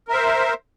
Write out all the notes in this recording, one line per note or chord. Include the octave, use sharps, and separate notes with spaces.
A#4 C5 E5